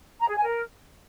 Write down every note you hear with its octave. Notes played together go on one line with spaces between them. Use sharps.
A#5
G#4
G#5
A#4